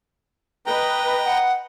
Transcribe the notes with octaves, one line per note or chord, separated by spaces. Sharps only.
B4 D#5 G5 A#5
F#5